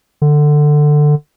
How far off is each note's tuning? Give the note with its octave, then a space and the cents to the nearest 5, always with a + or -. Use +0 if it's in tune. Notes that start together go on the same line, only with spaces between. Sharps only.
D3 +15